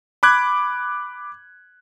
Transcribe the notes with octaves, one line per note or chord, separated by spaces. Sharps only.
B5 D6 F#6 G#6